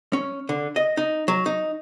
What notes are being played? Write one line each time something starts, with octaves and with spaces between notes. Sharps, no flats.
C#4
D3
D#5
D#4
F#3
D#4